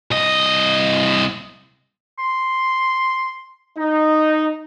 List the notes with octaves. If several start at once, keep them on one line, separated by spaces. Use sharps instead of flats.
C2 D#5
C6
D#4